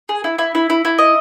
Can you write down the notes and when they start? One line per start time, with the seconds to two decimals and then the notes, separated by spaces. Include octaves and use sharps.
0.09 G#4
0.24 E4
0.38 E4
0.55 E4
0.70 E4
0.85 E4
0.98 D#5